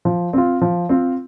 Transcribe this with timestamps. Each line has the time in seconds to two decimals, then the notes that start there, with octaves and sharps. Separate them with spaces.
0.05 F3
0.33 C4 F4
0.62 F3
0.89 C4 F4